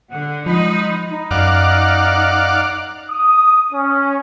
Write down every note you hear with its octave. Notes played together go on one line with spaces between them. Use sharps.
D3 F#5
F3 G#3 D#4 B5
D#4
F#2 D5 F5 F#5
D#6
C#4